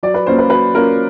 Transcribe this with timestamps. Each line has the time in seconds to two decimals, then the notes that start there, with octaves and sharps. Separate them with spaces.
0.03 F#3 D5
0.14 B4
0.26 A#3 C#4 F4 C5
0.38 B4
0.50 F#3 B4
0.74 A#3 C#4 F4 A#4